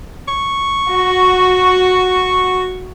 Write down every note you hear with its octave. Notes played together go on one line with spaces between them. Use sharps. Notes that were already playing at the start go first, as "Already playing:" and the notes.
C#6
F#4